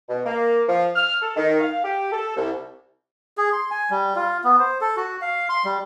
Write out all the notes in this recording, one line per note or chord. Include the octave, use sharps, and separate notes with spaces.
B2
A#3
F3
F6
A4
D#3
F5
G4
A4
C2
G#4
C6
G#5
G3
F4
B3
C5
A4
F#4
F5
C6
G3